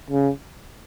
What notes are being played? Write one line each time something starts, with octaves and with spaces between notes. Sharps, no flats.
C#3